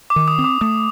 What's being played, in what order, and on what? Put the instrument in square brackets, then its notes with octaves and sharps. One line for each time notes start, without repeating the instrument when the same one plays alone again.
[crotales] D6
[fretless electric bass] D#3
[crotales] D#6
[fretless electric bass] C4
[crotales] D6
[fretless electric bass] A3 [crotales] D#6